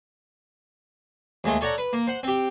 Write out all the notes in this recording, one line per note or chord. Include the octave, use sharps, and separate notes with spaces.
D#2 G#3 A3 C6
A4 C#5 D5 F#5 A#5
B4
A#3
C5 F#5
C4 G4